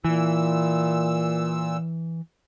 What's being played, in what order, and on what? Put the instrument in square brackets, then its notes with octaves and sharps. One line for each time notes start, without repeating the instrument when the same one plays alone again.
[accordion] A#2 E6 [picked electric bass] E3